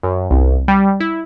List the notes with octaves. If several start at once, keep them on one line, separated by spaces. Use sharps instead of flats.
F#2
C2
G3
E4